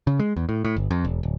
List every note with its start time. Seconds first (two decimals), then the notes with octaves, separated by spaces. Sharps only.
0.07 C#3
0.20 G#3
0.37 E2
0.49 A2
0.65 A2
0.77 G1
0.91 F2
1.04 E1
1.23 D1